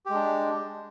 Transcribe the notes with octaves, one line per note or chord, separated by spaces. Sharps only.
G#3 D4 G4